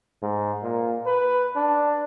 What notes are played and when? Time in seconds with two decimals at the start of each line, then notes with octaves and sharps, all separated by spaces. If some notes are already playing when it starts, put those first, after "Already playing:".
0.22 G#2
0.63 A#2
1.06 B4
1.56 D4